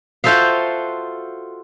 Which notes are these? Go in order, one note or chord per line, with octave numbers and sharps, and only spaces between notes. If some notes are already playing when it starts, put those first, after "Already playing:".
F4 F#4 A4 C5 E5 F5